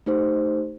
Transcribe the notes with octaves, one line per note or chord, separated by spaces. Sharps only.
A3 D#4 G4 C5